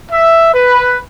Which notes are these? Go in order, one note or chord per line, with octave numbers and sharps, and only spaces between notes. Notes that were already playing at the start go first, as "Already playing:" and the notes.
E5
B4